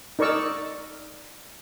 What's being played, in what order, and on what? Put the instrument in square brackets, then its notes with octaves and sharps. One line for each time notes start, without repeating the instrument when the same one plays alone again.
[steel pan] D#4 A#4 D5 C#6 E6